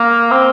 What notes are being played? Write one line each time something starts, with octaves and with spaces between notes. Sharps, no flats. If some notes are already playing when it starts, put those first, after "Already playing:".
Already playing: A#3
C4